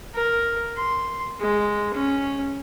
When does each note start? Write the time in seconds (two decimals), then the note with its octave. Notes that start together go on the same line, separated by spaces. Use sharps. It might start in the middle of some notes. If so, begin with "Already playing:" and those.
0.14 A#4
0.77 C6
1.40 G#3
1.93 C#4